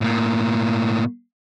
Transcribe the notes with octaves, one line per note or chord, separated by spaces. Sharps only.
A2 A#3